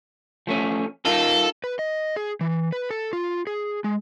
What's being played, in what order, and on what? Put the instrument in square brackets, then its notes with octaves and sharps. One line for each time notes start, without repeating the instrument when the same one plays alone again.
[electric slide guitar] F3 A3 C#4
[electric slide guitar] D#4 F4 A#4 [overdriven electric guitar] A4
[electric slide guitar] B4
D#5
G#4
E3
B4
A4
F4
G#4
G#3